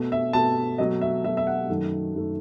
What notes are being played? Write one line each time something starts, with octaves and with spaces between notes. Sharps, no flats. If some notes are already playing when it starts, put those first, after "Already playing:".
Already playing: B2 A3
E5
B2 A3 A5
B2 F#3 A3 D#5
E5
B2 F#3 A3 E5
E5
F#5
F#2 D#3 F#3 A3
F#2 D#3 F#3 A3